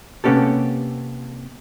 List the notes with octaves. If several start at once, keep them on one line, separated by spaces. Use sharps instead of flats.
C3 A#3 B3 C#4 G4 A4